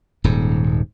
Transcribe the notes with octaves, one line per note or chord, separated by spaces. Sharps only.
D#1 G#2